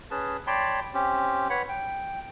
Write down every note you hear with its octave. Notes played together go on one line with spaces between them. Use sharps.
C#4 G#4 B4 A5
C#5 D5 G5 A5 B5 C6
C4 C#4 G4
B4 C#5 F#5 B5
G5